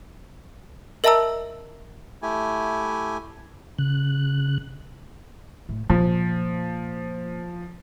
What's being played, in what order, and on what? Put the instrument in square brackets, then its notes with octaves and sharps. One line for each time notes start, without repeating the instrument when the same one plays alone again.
[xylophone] A#4 D#5 E5 A5 A#5 E6
[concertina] A3 E4 G4 G#5
[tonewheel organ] C#3 F#6
[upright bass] A2
[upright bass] A#2 [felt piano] F3